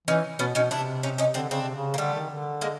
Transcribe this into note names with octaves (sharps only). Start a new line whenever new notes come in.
E3 C#4 D#4
B2 B3 C#4
B2 C#4 D#4
C3 D4 E4
C#4 D#4
C#4 D#4
D3 C4 D4
C#3 C4 D4
C3
C#3
A#3
D3 G3 A3
D#3
D3
G#3 A#3